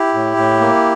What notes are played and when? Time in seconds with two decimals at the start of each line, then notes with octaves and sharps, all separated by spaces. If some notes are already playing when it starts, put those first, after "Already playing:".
Already playing: E4 G4
0.14 A2
0.37 A2
0.61 A#3